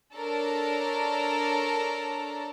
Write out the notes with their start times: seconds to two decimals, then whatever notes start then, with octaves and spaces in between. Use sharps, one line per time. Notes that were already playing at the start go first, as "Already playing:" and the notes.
0.16 D4 A4 A#4 C#5 A5 A#5